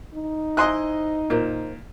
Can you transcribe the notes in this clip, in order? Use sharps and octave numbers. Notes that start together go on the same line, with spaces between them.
D#4
E4 C5 D#5 G#5 C6 F#6
A#2 A#4 C5